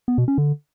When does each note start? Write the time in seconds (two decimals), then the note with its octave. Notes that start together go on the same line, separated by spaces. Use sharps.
0.08 B3
0.18 B2
0.28 C#4
0.38 D3